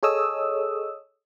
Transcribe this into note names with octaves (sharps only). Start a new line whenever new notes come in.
G#4 A4 C#5 D#5 D#6 E6